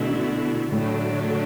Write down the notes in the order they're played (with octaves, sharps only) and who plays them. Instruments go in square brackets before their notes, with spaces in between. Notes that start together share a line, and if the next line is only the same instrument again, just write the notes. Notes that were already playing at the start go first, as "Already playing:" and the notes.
Already playing: [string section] B2 A3 E4 [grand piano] D3 E3
[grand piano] D3
[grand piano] A2 [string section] D3 F#3 A3 D4